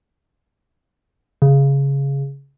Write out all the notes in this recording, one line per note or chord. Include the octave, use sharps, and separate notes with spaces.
C#3